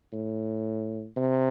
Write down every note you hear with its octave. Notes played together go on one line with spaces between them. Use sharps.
A2
C3